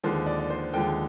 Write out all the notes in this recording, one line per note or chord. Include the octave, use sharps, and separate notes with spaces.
D#2 D3 F3 G#3 C5
D5
D5
C5
D#2 D3 F3 G#3 G5